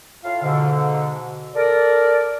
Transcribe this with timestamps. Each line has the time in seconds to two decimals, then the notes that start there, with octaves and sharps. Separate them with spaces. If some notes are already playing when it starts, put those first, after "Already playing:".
0.23 A2 F4 F5
0.43 G#2 B2 D3
1.55 A4 A#4 D5